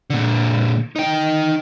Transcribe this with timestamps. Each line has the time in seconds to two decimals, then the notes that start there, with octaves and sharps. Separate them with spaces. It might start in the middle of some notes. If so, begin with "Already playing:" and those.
0.10 A#2 D3
0.96 D#4 G5